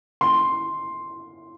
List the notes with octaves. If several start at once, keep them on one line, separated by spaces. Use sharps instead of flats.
C6